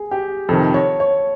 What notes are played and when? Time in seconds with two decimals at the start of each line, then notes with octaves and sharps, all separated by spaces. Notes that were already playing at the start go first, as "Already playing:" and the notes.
Already playing: G#4
0.11 G4
0.49 F2 C3 D#3 A4
0.74 C#5
1.00 C#5